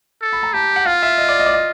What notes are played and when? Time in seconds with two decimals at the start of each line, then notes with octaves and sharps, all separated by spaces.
0.22 A4
0.33 B5
0.43 A#5
0.53 G4 A5
0.76 F#5
0.86 F4 F5
1.03 E5
1.18 D#5
1.29 D5
1.39 D#5
1.46 D5
1.53 D#5